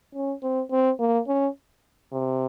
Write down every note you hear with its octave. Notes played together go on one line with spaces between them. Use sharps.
C#4
C4
C4
A#3
C#4
C3